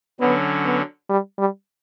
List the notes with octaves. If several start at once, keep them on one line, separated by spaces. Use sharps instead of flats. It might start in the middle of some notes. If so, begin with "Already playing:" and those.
D3 F#3 B3 C#4
B3
G3
G3